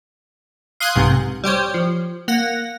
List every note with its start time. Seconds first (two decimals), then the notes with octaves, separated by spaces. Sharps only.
0.80 F5 C6 D#6 F#6 G#6 C7
0.95 B1 G#2 C3
1.44 G3 G4 C5 C#5
1.74 F3
2.28 A#3 F#5 A#6